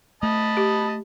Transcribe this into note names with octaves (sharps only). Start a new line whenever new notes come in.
A3 D#5 A5 B5
G4